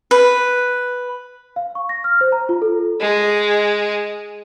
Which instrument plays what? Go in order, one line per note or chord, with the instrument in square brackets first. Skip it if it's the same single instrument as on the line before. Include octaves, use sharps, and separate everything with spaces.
[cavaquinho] B4
[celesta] F5
C#6
A#6
F6
C5
A#5
F4
A4
[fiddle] G#3